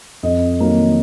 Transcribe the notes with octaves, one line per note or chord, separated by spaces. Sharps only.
F2 D#5
D#3 F#3 A#3